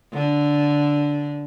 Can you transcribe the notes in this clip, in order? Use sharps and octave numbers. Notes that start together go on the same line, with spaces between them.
D3